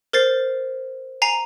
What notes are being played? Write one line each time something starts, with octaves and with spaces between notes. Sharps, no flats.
A#4 C5 A6 C7
G#5 A#5 C7